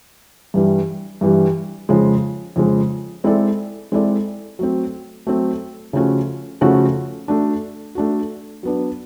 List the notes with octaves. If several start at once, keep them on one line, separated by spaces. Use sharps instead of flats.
G2 E3 G3
G2 E3 G3
F2 C#3 F3 G#3
F2 C#3 F3 G#3
G#3 C4 E4 A4 D5
G#3 C4 E4 A4 D5
F#3 A3 C4
F#3 A3 C4
C#3 F3 A3 C#4 F#4
C#3 F3 A3 C#4 F#4
A3 D4 F#4
A3 D4 F#4
F#3 B3 D4